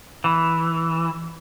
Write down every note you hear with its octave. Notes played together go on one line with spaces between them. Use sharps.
E3